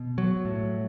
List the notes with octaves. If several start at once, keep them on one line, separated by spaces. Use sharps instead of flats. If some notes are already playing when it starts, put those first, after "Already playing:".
Already playing: B2
F#3
A2